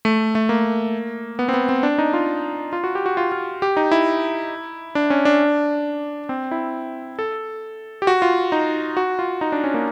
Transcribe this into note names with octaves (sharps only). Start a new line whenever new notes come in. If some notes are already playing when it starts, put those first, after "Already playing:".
A3
A3
A#3
B3
C4
B3
C4
D4
D#4
F4
F4
F#4
G4
F#4
F4
F4
G4
D#4
E4
D4
C#4
D4
C4
E4
A4
G4
F#4
F4
D#4
F#4
F4
D#4
D4
C#4
A#3